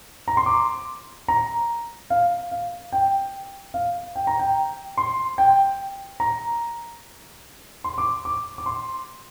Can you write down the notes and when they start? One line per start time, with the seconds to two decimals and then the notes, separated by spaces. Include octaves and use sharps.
0.28 A#5
0.37 C6
0.46 D6
1.28 A#5
2.10 F5
2.51 F5
2.92 G5
3.74 F5
4.15 G5
4.27 A#5
4.39 G5
4.97 C6
5.38 G5
6.20 A#5
7.84 C6
7.98 D6
8.25 D6
8.58 D6
8.66 C6